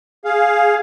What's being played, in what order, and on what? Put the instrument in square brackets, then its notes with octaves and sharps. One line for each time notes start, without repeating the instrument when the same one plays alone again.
[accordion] G#4 F5